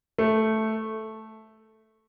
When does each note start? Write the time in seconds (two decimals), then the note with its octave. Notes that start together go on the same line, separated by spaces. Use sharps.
0.18 A3